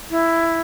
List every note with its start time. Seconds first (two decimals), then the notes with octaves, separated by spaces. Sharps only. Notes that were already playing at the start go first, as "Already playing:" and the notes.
0.10 E4